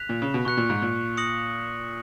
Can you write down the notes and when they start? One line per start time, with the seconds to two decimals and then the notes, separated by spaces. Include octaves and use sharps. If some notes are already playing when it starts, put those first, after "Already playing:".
Already playing: F#6 B6 F7
0.09 A#2
0.22 C#3
0.34 B2
0.45 B2 C#6 F#6 C#7
0.57 A#2
0.70 G#2
0.82 A#2
1.17 D#6 A#6 C#7 F#7